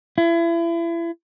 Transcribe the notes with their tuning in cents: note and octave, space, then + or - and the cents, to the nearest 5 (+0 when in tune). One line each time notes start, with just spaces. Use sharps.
E4 +35